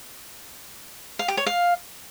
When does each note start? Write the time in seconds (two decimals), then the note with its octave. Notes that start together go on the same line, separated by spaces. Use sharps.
1.19 F5
1.28 G4
1.37 C#5
1.46 F5